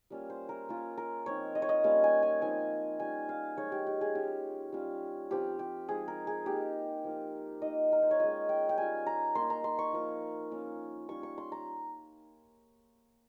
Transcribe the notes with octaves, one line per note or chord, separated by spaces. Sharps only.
G3 A#3 C#4 F4
C5
A#4
A#3 C#4 F4
A#4
F3 C4 D#4 C#5
D#5
C#5
D#5
G3 A#3 C#4 F4 F5
G#5
G#5
F3 C4 D#4 G#5
G3 C#4 F4 G#5
F5
F3 G#3 D#4 C#5
G4
G4
G#4
G#3 C#4 F4 G4
G3 C#4 F4
F3 C4 F4 G4
G4
F3 G#3 D#4 G#4
A#4
G#4
A#3 D#4 G4
F3 A#3 F4
A#3 D#4 D#5
A#4
C5
C#5
G#3 C#4 F4 D#5
G5
G5
G3 C#4 F4 G#5
A#5
A#3 D#4 C6
A#5
C6
C#6
F3 A#3 F4
A#3 C#4 F4
G3 C#4 F4 C#6
C#6
C6
A#5